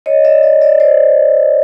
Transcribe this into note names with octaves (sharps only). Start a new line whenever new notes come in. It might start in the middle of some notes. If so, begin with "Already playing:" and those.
C#5 D#5
D5 E5
D5 E5
D5 E5
C5 D5